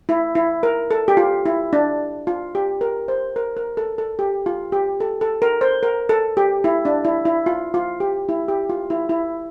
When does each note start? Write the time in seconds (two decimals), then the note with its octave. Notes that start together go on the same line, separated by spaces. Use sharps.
0.09 E4
0.35 E4
0.63 A#4
0.91 A4
1.08 G4
1.17 F4
1.46 E4
1.73 D4
2.27 F4
2.55 G4
2.81 A#4
3.08 C5
3.36 A#4
3.57 A#4
3.77 A4
3.98 A4
4.19 G4
4.46 F4
4.72 G4
5.00 A4
5.21 A4
5.42 A#4
5.61 C5
5.83 A#4
6.09 A4
6.37 G4
6.64 E4
6.85 D4
7.05 E4
7.25 E4
7.46 F4
7.74 F4
8.00 G4
8.29 E4
8.48 G4
8.69 F4
8.90 E4
9.09 E4